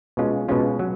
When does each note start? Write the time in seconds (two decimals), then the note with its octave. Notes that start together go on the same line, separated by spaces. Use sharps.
0.17 B2 G#3 C#4 F4
0.49 B2 G#3 C#4 F4
0.79 F#3